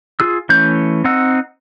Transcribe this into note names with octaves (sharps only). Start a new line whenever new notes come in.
F4 G#4 E6
E3 A3 C#4 G6
C4 D#4 F#5 E6